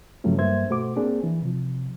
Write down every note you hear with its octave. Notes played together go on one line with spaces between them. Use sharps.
G2 C#3 F3 F#3 A3 C#4
G2 A#3 C5 E5 G#6
B2 A3 F#4 C5 D6
A#3 C4 D4 G#4
E3
C3 F3